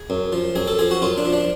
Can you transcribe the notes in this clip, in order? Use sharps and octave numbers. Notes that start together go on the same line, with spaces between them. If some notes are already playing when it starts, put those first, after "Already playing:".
Already playing: G#4
F#2
F3
F#2 G#4
A4
F3 G#4
F#4
F#2 F4
D4
F3
D4